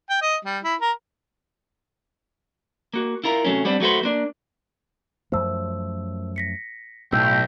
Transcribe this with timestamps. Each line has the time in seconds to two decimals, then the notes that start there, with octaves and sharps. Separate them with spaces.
0.10 G5
0.22 D#5
0.45 G3
0.64 E4
0.81 A#4
2.94 A#3 F#4
3.24 E4 F4 A#4 A#5
3.45 C3 F#3 A3 C#4
3.65 G3 B3 C4 D4
3.80 F#3 A3 F#4 B4 C5
4.03 A#3 D4
5.32 F#2 F3 A3 C5 E6
6.36 A#6 B6 C#7
7.12 B1 A2 G5 E6